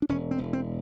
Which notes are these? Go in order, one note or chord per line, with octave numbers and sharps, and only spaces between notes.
D4
E1 C#4
C4
E1
C4